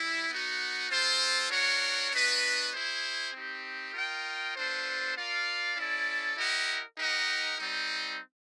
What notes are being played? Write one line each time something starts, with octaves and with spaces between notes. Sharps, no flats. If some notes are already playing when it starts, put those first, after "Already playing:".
Already playing: G3 E4
B3 D#4 F#4
C4 F4 A4 C5
D4 F#4 A#4 C#5
B3 D4 F#4 B4 D#5
E4 G#4 C5
C4 D#4 G4
F4 A#4 D#5 G5
B3 D4 F4 A4 C5
F4 A#4 D5 F5
C#4 E4 A4 D5
E4 G4 A#4 D#5 F#5
D#4 G4 A#4 D#5 F#5
G3 C4 D#4